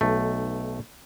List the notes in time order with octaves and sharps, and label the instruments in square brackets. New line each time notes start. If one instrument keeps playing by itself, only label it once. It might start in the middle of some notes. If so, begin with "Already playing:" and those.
[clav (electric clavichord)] B1 A3